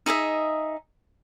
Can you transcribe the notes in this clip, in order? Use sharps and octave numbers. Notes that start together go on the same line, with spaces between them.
D#4 G#4 D#5 E5